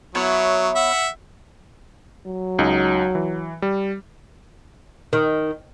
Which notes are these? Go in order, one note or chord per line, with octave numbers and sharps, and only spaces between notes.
F#3 B3 E4 C#5
E5 F#5
F#3
C#2 D#4
E3
G3
D#3